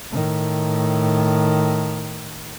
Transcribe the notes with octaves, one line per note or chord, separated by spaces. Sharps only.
A2 D#3